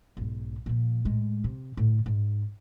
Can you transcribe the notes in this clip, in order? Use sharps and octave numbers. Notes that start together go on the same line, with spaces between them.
B1 G#2
A#2 F3
A2 G#3
C3
A2 D3
G#2